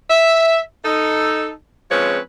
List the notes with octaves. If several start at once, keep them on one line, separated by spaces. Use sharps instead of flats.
E5
D#4 A4
F3 G#3 C4 C#4 B4 C#5